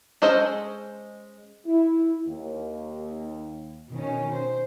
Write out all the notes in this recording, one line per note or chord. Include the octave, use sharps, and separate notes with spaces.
G#3 C#4 A4 C5 D#5
E4
D#2
B2 D#3 C#4
C5